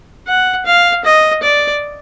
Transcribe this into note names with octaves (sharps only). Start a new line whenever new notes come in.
F#5
F5
D#5
D5